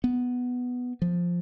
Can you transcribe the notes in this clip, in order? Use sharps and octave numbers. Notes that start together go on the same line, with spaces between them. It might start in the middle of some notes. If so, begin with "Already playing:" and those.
B3
F3